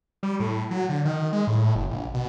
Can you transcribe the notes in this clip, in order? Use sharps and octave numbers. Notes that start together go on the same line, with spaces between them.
G3
A2
F#3
D3
D#3
G#3
A2
F#1
A#1
B2